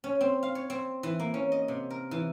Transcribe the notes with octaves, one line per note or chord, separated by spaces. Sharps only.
C#4
C4
F5
C#5
C4
E3
A#3
C#4
D#5
C3
A#4
E3